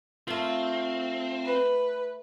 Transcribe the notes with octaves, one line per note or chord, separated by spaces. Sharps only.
A3 C4 F4 A#4
B4